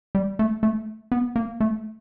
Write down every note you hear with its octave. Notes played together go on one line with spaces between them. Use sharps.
G3
A3
A3
B3
A#3
A3